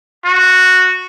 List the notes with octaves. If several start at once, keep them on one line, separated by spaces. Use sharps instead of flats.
F#4